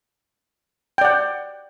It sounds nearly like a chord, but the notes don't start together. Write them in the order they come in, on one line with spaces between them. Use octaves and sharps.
G5 D5 F#5